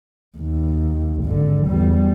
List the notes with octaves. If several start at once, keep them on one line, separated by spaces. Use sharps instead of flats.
D#2
G#1 D3
E2 G3